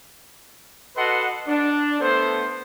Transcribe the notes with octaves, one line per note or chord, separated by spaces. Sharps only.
F#4 A4 B4 D#5 F#5 C6
D4
A3 B3 A4 C5